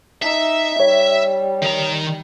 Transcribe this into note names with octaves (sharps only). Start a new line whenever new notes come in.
D#4 E5
G3 C#5
D#3 A#5